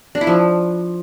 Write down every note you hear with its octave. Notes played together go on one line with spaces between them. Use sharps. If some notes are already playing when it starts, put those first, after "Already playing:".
D4
E4
F3